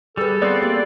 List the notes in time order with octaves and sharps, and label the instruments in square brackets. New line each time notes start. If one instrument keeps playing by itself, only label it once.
[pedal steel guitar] G3 [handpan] G#4 B4 [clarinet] A4
[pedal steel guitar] B3 C4 F4 [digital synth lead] D5
[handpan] A#3 G4